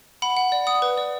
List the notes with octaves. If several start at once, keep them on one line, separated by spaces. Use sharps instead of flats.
F#5 B5
F#5
D5
F#5 D#6
B4
D5